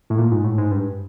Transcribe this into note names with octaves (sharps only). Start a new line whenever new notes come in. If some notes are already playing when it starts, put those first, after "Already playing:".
A2
A#2
G#2
A2
G#2
G2